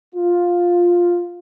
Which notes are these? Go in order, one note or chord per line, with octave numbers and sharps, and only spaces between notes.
F4